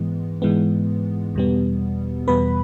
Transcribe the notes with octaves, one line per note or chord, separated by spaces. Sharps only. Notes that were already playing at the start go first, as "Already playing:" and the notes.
Already playing: G#2 E3 G#3 B3
G#2 E3 G#3 B3
E2 B2 G3 B3
E2 B2 G3 B3 B4 B5